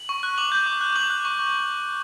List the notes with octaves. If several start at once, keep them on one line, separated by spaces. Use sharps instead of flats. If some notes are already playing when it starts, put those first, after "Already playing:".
Already playing: F#7
C#6
F#6
D6 F#7
G6
D6
F#6
D6 F#7
F#6
C#6